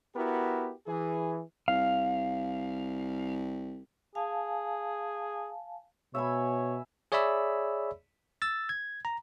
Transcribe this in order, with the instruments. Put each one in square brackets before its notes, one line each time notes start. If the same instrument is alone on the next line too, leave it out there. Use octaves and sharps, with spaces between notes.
[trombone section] B3 E4 F#4 G4 A#4
E3 G#4
[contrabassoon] C2 [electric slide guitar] F5
[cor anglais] G#4 [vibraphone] F5 G#5 A5
[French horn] B2 [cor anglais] C#5 [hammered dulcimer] E5 G#5 B5
[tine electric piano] G#4 C#5 D5 E5 B5 E6
E6 A6
G#6
A#5